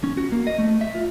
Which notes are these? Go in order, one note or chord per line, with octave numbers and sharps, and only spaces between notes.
C#4
F#4
A#3
D#5
A3
E5
F4